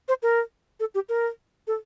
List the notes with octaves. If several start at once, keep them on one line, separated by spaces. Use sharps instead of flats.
C5
A#4
A4
G4
A#4
A4